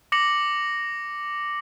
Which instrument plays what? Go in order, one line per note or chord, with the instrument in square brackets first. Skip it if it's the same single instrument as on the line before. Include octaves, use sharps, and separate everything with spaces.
[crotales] D6 A#6 C#7 F#7